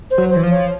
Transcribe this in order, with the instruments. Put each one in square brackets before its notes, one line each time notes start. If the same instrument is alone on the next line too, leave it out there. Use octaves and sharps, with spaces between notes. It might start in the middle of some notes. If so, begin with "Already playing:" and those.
[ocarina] C5
[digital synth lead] F#3
[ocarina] C5
[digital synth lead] E3
F3
[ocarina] C#5